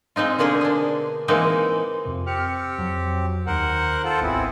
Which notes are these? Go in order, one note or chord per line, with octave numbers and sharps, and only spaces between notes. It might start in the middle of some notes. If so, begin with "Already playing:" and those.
G#3 C4 D#4 F4
B2 D3 A#3 G#4 A#4
D4 G#4
E3 G#3 A#3 C4 D#4
F2 C3
C4 G4 F6 C#7
F2 F#3
D#2 D#3 A#4 C5 F#5
F4 A4 C5
G#1 C#2 B3 C4 E4 G#5